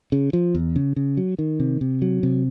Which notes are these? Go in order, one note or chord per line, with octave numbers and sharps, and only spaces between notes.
C#3
F3
E2
C#3
C#3
F#3
D#3
C3
C3
F#3
C3